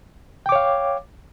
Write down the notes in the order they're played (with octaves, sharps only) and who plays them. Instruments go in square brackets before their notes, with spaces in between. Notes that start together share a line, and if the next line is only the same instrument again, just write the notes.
[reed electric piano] G5
D6
C#5
F5